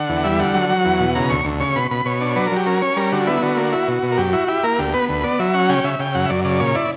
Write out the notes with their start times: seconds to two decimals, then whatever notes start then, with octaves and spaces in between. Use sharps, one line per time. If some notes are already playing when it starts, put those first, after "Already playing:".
Already playing: D3 F#5
0.09 E2
0.24 G3 E5
0.39 D3 F#5
0.54 F#3
0.69 F#3
0.85 E2
0.99 B2
1.15 C#3 A#5
1.30 D2 C#6
1.45 D2
1.60 C#3 C#6
1.76 B2 B5
1.91 B2 B5
2.05 B2 C#5
2.21 D4
2.36 F#3 B4
2.46 A#4
2.52 F#3 G4
2.66 C#4 A#4
2.81 C#4 C#5
2.96 G3 A#4
3.12 D3 F#4
3.27 B3 E4
3.42 D3 F#4
3.57 A#3
3.72 E4
3.88 B2
4.03 B2
4.12 A#4
4.18 F#2 G4
4.33 E4 F#4
4.48 E4 G4
4.63 A#3 A#4
4.79 D2 G4
4.93 B3 B4
5.09 D2 B4
5.24 B3 D5
5.39 F#3 E5
5.54 C#4 F#5
5.69 C#3 G5
5.84 C#3 E5
5.99 C#3 G5
6.15 F#2 F#5
6.25 E5
6.29 F#2 D5
6.44 C#3 D5
6.60 A#2 C#5
6.75 E4 D5